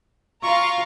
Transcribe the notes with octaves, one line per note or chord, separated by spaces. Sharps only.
F4 F5 A#5 C#6